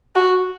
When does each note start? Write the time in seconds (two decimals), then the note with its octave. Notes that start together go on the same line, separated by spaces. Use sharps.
0.16 F#4